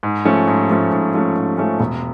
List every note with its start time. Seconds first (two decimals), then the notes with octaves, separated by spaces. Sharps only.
0.03 G#2
0.25 F3 A3 C#4
0.48 G#2
0.69 F3 A3 C#4
0.91 G#2
1.14 F3 A3 C#4
1.36 G#2
1.58 F3 A3 C#4
1.80 E1